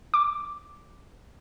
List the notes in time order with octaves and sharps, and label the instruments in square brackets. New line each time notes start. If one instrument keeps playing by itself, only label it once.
[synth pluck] D6